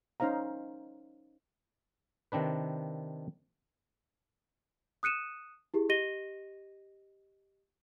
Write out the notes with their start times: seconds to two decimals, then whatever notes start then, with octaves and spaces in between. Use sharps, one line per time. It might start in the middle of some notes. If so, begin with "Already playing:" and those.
0.20 C#4 D#4 C5 F5 A#5
2.32 C3 D#3 C4 D4 B4
5.03 D#6 F#6 C#7 D#7 E7
5.74 E4 G4 G#4
5.89 G4 D#5 A#6 D#7 G7